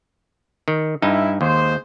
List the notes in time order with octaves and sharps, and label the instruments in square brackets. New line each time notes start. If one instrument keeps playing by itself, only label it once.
[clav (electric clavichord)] D#3
[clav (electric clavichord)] G2 D#4 [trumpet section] E4
[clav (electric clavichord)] D#2 [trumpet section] G#3 C5